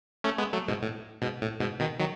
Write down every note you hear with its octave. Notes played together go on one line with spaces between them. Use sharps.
A3 C#4
G#3 B3
F#3 A3
G#2 B2
A2
G#2 B2
A2
G#2 B2
B2 D#3
D#3 F#3